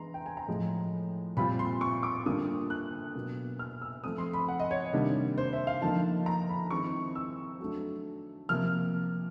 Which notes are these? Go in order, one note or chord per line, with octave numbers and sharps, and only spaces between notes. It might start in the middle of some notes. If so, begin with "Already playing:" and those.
Already playing: E3 G#3 B3 D4 A#5 C6
G5
G#5
A#5
A2 F3 G#3
A#2 G3 C4 F4 B5
C6
C#6
D6
D3 G3 A#3 D4 F4 D#6
F#6
B2 F#3 A#3
F6
E6
F3 A3 C4 D#6
C6
B5
F#5
D#5
C#5
C3 D#3 G3 A#3 D4
C5
E5
F5
D3 F3 A#3 D#4 A5
A#5
B5
D#3 G#3 C4 E4 C#6
E6
F#3 A3 D4
C3 F3 A#3 F6